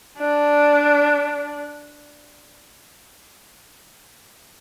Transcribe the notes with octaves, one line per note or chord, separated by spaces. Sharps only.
D4